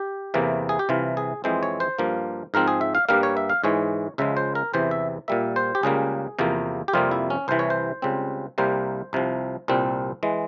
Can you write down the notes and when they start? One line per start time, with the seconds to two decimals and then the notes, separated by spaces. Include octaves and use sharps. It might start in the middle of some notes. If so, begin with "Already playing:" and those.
Already playing: G4
0.34 E2 C3 E3 A#3
0.69 G#4
0.79 G4
0.89 C2 C3 E3 F4
1.17 G#4
1.44 F2 E3 G#3 C4 C5
1.63 C#5
1.80 C5
1.99 G2 F3 A#3
2.54 G#2 F3 C4 A#4
2.68 G#4
2.81 E5
2.95 F5
3.09 G2 G3 A#3 F5
3.23 C#5
3.37 E5
3.50 F5
3.64 G#2 E3 G#3 C#5
4.18 C#2 C#3 F3 G#3 E5
4.37 C5
4.55 A#4
4.74 E2 C3 E3 C5
4.91 E5
5.28 A#2 G3 A#3 E5
5.56 C5
5.75 G4
5.83 C#2 C#3 G3 A#3 G#4
6.39 E2 C3 F3 A#3
6.88 G4
6.93 F2 C3 G3 A#3 F4
7.11 E4
7.30 C#4
7.48 C2 C3 E3 C5
7.59 C#5
7.70 C5
8.02 C#2 C#3 G3 C4
8.58 C2 C3 G3 A#3 C5
9.13 C2 C3 F3
9.68 C2 A#2 G3 C4
10.23 E3 G#3